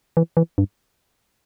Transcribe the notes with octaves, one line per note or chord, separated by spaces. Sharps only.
E3
E3
G2